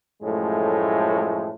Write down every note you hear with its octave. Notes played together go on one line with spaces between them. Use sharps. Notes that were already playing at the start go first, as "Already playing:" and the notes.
F#2 A2 F3 G#3 A3